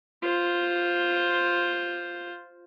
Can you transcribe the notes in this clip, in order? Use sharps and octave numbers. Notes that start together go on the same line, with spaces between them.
F4 C5